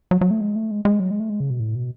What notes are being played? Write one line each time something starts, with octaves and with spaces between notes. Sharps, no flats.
F#3
F#3
A3
G#3
A3
G#3
G#3
F#3
G#3
A3
G#3
C#3
B2
A2
B2